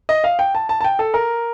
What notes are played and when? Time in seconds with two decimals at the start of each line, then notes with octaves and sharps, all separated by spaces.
0.09 D#5
0.24 F5
0.39 G5
0.55 A5
0.69 A5
0.81 A5
0.84 G5
0.99 A4
1.14 A#4